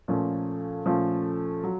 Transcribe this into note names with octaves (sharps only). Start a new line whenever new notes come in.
A#2 F3 A3 C#4
A#2 F3 A3 C#4
F#3